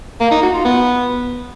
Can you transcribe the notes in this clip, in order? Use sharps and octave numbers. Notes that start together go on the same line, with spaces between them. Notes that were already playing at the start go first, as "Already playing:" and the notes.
A#3
D#4
F#4
F4
B3